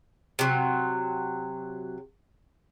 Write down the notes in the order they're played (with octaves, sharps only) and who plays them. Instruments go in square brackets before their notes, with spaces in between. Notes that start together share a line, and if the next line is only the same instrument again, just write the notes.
[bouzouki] C3 F#3